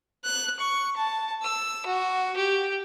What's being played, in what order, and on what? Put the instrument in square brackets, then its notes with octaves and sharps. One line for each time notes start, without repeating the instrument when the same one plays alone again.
[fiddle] F#6
C#6
A5
E6
F#4
G4